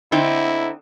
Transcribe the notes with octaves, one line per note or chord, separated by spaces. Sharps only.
D3 C4 D#4 E4